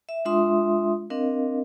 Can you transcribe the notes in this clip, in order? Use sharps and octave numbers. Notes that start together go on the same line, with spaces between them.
E5
G#3 D4 F4 E5 C6 D#6
C4 D4 A#4 D#5 F5